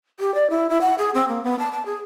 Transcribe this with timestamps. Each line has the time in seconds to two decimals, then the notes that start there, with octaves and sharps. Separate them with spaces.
0.20 G4
0.35 D5
0.50 E4
0.70 E4
0.81 F#5
0.98 G#4
1.15 C4
1.28 A#3
1.44 B3
1.59 A5
1.72 A5
1.86 G#4